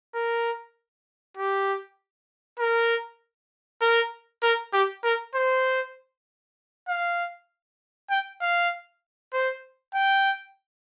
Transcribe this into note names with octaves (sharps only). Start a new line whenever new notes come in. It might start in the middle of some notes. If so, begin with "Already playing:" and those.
A#4
G4
A#4
A#4
A#4
G4
A#4
C5
F5
G5
F5
C5
G5